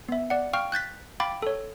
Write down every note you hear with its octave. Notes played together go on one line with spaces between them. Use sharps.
B3 E5
D5 F#5
F5 G5 C#6 F6
F#6 G6 A6 B6
F5 G5 B5 D6 A6
A4 C#5